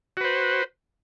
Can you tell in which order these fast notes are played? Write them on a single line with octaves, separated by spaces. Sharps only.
F#4 B4 C5